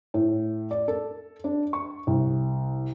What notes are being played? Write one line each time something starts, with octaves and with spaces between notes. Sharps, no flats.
A2
D5
A4
D4
C#6
C2